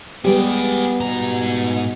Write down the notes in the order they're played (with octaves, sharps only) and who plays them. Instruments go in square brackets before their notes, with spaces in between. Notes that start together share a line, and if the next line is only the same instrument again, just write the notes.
[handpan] G3 G4 [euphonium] G#3 [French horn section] B3 [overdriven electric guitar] G#4 D5
[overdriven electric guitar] G#2 A#5 [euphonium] B2